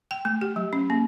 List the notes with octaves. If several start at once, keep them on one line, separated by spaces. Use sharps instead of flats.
G5
A3
G4
F#3
C#4
A#3